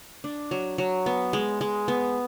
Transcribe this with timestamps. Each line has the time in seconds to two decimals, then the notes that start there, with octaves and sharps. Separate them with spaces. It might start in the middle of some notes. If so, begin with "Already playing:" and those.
0.24 D4
0.51 F#3
0.78 F#3
1.06 B3
1.33 G#3
1.61 G#3
1.88 B3